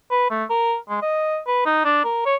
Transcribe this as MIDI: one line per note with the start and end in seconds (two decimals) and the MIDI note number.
0.11 0.28 71
0.30 0.44 57
0.50 0.77 70
0.89 1.01 56
1.02 1.39 75
1.47 1.61 71
1.66 1.83 63
1.85 2.03 62
2.04 2.25 70
2.26 2.36 73